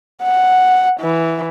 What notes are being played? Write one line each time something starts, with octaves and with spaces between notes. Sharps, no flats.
F#5
E3